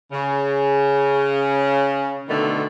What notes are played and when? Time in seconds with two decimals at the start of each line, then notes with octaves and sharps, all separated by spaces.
0.12 C#3
2.29 B2 D3 D#3 A3